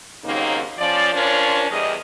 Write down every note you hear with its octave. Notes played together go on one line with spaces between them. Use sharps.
D#2 C#3 F#3 A#3 C4 D#4
F3 C#4 D5
C#4 D4 F4 A#4 C5 C#5
E2 G3 G#4 D#5